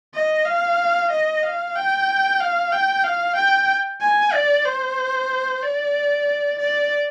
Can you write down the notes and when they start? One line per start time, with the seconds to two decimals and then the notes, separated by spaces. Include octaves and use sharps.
0.14 D#5
0.46 F5
1.11 D#5
1.43 F5
1.76 G5
2.41 F5
2.72 G5
3.04 F5
3.36 G5
4.01 G#5
4.33 D5
4.65 C5
5.63 D5
6.59 D5